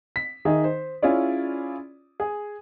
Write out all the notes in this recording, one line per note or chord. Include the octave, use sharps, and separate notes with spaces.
B6
D#3 D#4 G#4 E5
C5
C#4 E4 F4 G#4 C#5 D5
G#4